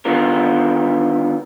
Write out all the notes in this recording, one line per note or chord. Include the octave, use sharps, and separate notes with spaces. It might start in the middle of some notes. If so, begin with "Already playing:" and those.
D3 D#3 B3 F4 A#4